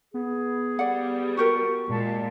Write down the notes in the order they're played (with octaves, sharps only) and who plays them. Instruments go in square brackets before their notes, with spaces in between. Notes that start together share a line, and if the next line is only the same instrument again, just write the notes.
[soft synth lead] B3 [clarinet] G#4
[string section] G3 [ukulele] D5 F#5
[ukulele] F#4 G4 A#4 [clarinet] C#6
[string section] A#2 [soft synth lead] G#3 [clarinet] A5